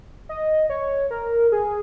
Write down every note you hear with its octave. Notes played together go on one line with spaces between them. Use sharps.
D#5
C#5
A#4
G#4